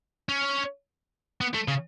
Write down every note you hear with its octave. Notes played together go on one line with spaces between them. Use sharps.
C#4
B3
A3
C#3